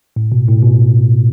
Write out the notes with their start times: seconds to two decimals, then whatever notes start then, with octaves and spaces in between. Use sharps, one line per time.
0.16 A2
0.32 B2
0.48 A2
0.63 B2